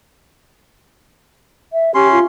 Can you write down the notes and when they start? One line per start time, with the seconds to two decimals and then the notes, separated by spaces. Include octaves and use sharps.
1.73 E5
1.95 C#4 G4 C6
2.12 F4